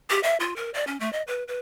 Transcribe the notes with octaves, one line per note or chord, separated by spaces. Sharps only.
G4
E5
F4
A#4
D5
C#4
A3
D#5
B4
B4